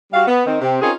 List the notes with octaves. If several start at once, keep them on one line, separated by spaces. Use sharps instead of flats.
G3 F#4 F5
B3
D#3 C4
C3 C4
C4 C#4 D#4 F4 G#4 A#4